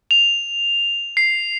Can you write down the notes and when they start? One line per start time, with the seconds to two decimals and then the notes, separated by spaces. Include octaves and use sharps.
0.11 F7
1.17 C7